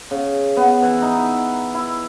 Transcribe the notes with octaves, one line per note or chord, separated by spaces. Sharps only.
C#3
B3
E3
D#4
E5
E4